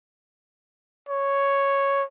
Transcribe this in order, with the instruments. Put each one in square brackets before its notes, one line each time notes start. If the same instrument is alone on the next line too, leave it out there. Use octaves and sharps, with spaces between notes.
[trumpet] C#5